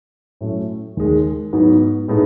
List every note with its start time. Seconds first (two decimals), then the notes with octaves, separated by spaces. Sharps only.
0.41 A2 F#3 A3 C#4
0.97 D#2 D#3 G#3
1.53 G#2 F#3 B3 D#4
2.08 A2 G#3 B3 D#4